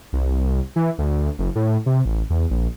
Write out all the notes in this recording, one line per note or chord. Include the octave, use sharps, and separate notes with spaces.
C2
E3
D2
F#1
A2
C3
A1
E2
A#1